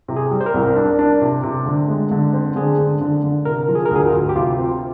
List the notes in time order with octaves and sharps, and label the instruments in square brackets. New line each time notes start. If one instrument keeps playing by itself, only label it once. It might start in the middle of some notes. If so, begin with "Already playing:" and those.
[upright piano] C3
[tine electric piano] G#4
[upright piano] G3
[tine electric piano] C5
A#4
[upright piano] C2
D4
D4
C3
C3
D3
G#3
D3
C4
[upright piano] D3 [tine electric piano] G#4
[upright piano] D3
D3
D3
[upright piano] C3 [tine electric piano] A#4
[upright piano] F3
[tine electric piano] G#4
A#4
[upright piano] D2 [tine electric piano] G#4
[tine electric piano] F4
[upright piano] D2
[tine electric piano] G4
[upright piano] C3 [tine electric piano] F4
[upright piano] C4